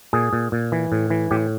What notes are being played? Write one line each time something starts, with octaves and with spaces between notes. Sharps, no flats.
A#2 G#4
A#2
A#2
E3
A2
E3
A2 G4